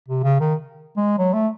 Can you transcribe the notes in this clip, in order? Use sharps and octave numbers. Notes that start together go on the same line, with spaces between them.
C3
C#3
D#3
G#3
F#3
A3